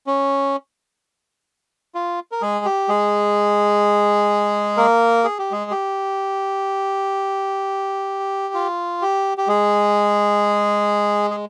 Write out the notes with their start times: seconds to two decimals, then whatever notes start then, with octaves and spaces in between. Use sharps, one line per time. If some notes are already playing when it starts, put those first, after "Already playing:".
0.07 C#4
1.95 F4
2.32 A#4
2.42 G#3 G#4
2.65 G4
2.89 G#3 G#4
4.77 A#3 A#4
5.24 G#4
5.39 G4
5.51 G#3 G#4
5.71 G4
8.54 F4
9.02 G4
9.38 G4
9.48 G#3 G#4
11.31 G#4